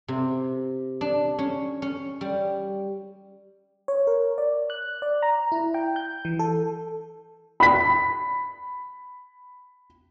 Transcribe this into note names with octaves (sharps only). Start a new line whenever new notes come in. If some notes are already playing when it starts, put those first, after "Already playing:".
C3
D4
C#4
C#4
G3
C#5
A#4
D5
F#6
D5
A#5
E4
G5
G6
E3
A4
B5 B6